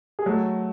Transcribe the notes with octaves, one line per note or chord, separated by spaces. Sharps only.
G#4
F#3 A3 A4